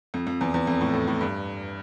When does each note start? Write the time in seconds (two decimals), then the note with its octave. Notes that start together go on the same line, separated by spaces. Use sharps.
0.14 F2
0.27 F2
0.41 E2
0.54 E2
0.67 F2
0.81 A2
0.93 A2
1.07 A2
1.21 G2